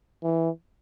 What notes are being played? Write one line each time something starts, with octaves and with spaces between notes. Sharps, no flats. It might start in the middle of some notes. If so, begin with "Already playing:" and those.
E3